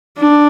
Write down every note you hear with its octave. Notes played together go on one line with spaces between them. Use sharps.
D4